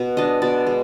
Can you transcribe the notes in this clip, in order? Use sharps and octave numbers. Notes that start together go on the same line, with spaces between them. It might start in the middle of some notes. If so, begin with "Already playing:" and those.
Already playing: B2
G#3 D4 D#5
B2 D5
G#3